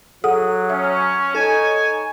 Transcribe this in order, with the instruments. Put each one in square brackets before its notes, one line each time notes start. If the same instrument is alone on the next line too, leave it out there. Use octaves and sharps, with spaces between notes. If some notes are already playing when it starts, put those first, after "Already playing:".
[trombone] F#3 [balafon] G#4 A4 F#5 [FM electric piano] D#6
[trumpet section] C#4 [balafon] E5
[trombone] D#4 [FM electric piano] A4 [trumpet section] C#5 G#5